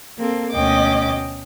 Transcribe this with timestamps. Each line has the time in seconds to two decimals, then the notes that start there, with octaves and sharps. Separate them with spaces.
0.18 A#3 C4 A4
0.53 D2 B2 C#4 D#5 G5 D6